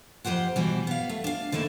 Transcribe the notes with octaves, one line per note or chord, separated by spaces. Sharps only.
F2 F3 G4 C5 F#5
B2 E3 G3
B3 F5
A3
D4 F5
D3 D#3 A3 A#3 E4